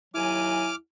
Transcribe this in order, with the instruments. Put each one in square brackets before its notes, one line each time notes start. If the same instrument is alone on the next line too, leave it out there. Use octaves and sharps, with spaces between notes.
[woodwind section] D#2 F#3 G#5 [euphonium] E4 [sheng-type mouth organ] D6 F6